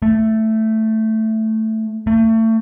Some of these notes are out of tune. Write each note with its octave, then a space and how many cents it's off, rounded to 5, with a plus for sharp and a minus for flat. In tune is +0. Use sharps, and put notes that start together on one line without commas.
A3 +5
A3 +30